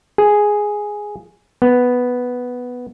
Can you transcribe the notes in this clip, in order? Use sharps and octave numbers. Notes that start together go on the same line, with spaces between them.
G#4
B3